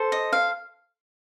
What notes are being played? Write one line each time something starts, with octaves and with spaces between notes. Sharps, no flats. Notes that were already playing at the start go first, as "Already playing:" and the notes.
Already playing: A4 C5
D#5
F5